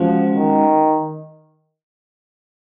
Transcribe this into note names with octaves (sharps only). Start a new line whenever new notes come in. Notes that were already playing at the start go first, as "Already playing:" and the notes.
Already playing: F3 G#3 C#4 F#4
D#3